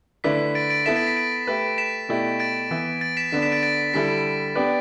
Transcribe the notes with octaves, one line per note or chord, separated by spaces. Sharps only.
D3 A3 E4 B4 D5 B6
A6 D7
A6 D7
B3 E4 A4 E5 B6 E7
A6 D7
B6
A6 D7
A3 G4 B4 E5
B6 E7
B2 A3 E4 G4 D5
A6 D7
E3 B3 E4
A6 D7
B6 E7
D3 B3 D4 B6 E7
B6 E7
A6 D7
A6 D7
D3 G3 E4 A4 B6
B3 D4 G4 B4 D5